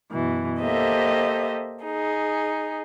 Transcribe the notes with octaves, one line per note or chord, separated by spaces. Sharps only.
F#2 B2 E3
A#3 G4 A4 C5 D#5 E5
D#4 G#4